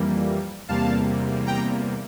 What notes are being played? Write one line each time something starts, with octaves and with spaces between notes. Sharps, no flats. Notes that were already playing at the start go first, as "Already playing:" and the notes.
Already playing: F2 E3 G3 A#3
E2 C3 G3 A#3 F5 A5
G5 A#5